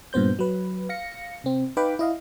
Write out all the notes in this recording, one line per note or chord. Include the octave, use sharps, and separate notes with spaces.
G2 A#2 B3 C5 G6
F#3 B4
F5 A#6 C#7
C3 C4
D#4 B4 F5 G5 B5 D6
E4 D#5 F5